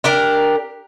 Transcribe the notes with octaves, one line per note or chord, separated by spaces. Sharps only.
D4 G4 A#4